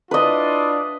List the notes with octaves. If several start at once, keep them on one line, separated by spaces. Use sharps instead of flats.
D4 E4 F4 B4 D#5